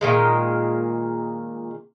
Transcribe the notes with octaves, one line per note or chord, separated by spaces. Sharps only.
A#2 D#3 G#3